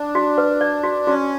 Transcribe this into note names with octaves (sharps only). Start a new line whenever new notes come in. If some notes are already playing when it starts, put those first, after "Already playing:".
Already playing: D4
F#4
B4
D5
F#4
C#4 F#4